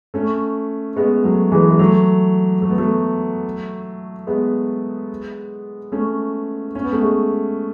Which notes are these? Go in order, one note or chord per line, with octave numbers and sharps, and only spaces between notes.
A3 C#4
G#3 B3
F#3 A3
E3 G#3
G#3
F#3 A3
A3
B3
F#3 A3
G#3 B3
A3 C#4
C#4
B3
A3
G#3 B3